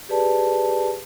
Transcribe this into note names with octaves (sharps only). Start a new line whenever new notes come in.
G4 G#4 B4 D5 A5